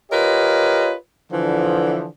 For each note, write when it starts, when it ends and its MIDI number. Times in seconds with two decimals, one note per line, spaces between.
0.11 0.94 65
0.11 0.94 67
0.11 0.94 70
0.11 0.94 71
0.11 0.94 73
0.11 0.94 75
1.32 2.07 50
1.32 2.07 52
1.32 2.07 53